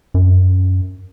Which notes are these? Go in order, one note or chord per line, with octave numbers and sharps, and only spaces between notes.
F#2